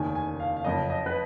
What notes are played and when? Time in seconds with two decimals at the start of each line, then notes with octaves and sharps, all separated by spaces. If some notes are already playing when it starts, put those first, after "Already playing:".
Already playing: F1 D#2 D#3 G#5
0.15 G#5
0.40 F5
0.56 F5
0.64 F#1 F2 F3 D#5
0.90 D#5
1.06 B4